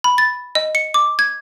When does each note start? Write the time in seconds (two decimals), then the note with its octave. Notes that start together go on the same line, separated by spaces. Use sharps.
0.04 B5
0.18 A6
0.55 D#5
0.75 C#7
0.94 D6
1.19 G#6